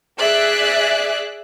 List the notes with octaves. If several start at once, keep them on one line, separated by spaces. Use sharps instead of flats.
G#4 D5 E5 F#6